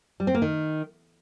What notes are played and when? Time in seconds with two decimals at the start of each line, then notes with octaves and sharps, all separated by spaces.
0.20 G3
0.27 C4
0.35 A#3
0.42 D#3